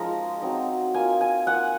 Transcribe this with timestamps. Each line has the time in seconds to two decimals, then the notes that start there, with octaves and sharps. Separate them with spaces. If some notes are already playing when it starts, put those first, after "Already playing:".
Already playing: F3 G#3 A#3 C#4 D#4 F4 A#5
0.42 F#3 C4 D#4
0.94 A#3 F4 G#5
1.21 G#5
1.47 A#3 F4 F#5